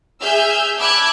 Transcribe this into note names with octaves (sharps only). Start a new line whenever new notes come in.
G#4 E5 G#5 E6 F6 G6
A5 B5 D6 E6 F#6 G#6